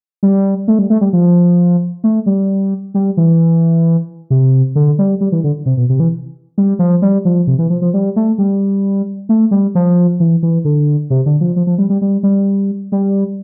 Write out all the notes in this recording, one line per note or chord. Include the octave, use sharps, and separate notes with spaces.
G3
A3
G3
A3
G3
F3
A3
G3
G3
E3
C3
D3
G3
G3
E3
D3
C3
B2
C3
E3
G3
F3
G3
F3
C3
E3
F3
F3
G3
A3
G3
A3
G3
F3
E3
E3
D3
C3
D3
F3
F3
F3
G3
G3
G3
G3
G3